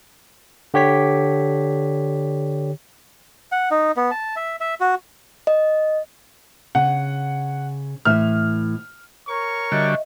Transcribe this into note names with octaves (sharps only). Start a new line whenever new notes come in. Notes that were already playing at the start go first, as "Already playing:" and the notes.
D3 G4 C#5 B6
F#5
D#4
B3
A5
E5
E5
F#4
D#5
C#3 F#5
A2 E3 E5 F6
A#4 C#5 C#6
D3 G3 F#4 D#5 E5